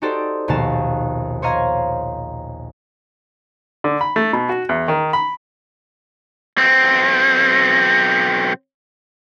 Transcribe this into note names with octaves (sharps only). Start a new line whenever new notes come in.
D#4 F#4 G4 A4 C5 D5
A#1 D#2 B2 A#3 F5 A5
C5 C#5 D#5 F5 A#5 G#6
D3
B5
A3
B2
F#4
E2
D#3
B5
B1 C4